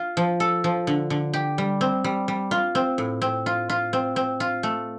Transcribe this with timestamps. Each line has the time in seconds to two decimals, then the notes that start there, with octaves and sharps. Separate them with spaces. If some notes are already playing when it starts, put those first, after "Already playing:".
Already playing: F4
0.17 F3
0.40 A4
0.64 F3
0.87 D3
1.10 D3
1.33 G4
1.58 G3
1.81 C4
2.04 G3
2.28 G3
2.51 F4
2.75 C4
2.98 A2
3.22 C4
3.46 F4
3.70 F4
3.93 C4
4.16 C4
4.40 F4
4.63 A3